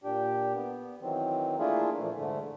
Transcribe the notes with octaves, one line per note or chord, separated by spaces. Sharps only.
A#2 D4 G4
B3
D#3 E3 F#3 C4
A3 A#3 D4 E4 F4 G#4
A#2 E3 F3 A3
G#2 D3 A3